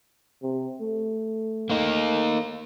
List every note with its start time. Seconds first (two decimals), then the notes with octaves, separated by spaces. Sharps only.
0.42 C3
0.81 A3
1.70 A#3 D#4